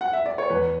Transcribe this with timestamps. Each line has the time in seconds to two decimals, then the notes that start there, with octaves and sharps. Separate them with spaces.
0.01 F#5
0.13 E5
0.26 D5
0.38 C#5
0.49 E2 B4